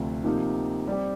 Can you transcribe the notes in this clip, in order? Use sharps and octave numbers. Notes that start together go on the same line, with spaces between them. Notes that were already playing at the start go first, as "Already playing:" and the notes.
Already playing: D2 C3 F3
C3 F3 A#3 D#4 G4
G3 C4 G4